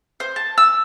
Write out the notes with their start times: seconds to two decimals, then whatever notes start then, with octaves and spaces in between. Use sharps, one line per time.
0.20 C5
0.36 A5
0.58 E6